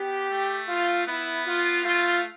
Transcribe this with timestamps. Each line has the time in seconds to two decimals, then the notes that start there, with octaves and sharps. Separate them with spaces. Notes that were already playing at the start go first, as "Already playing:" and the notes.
Already playing: B3 G4
0.31 A3
0.69 F4
1.07 B3 E4
1.46 F4
1.84 A3 F4